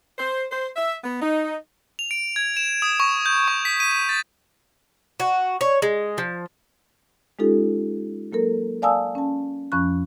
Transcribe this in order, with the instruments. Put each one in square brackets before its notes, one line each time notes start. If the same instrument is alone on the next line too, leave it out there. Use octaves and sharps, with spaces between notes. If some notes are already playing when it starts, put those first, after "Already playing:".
[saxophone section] C5
C5
E5
B3
D#4
[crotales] F7
D7
G#6
E7
D#6
C#6
G6
C#6
B6
D#7
D#7
A6
[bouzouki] F#4
C#5
G#3
F3
[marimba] G#3 C#4 D#4 F4 G4 A4
F#3 A#3 A4 A#4
D5 F5 G#5 A5 D#6 E6
C#4 A5
F2 F3 C#4 B5 C#6 F#6